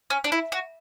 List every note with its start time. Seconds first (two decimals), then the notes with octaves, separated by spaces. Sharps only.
0.10 C#4
0.24 D4
0.32 E4
0.52 F#4